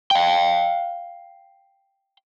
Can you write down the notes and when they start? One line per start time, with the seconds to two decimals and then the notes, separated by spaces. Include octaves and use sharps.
0.11 F5 G5